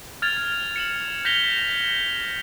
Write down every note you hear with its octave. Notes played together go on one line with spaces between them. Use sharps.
F6 G#6 A6 F7
C#7 E7 F#7
G6 A#6 B6 F7 G7